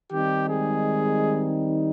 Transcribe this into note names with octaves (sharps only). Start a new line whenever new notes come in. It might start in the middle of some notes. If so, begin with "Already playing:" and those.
D#3 G3 C4 D#4 G4
G#3 G#4